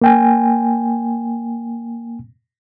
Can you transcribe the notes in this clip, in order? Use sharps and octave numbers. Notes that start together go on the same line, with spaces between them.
A#3 G5 G#5